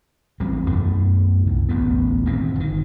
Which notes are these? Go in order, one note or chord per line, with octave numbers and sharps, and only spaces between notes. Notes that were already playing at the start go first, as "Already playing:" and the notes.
A1 E2 G3 C4
F#2 B2 A3
C2
D1 A1 E2 B3
D#1 F2 G#2 C4
G1 D#3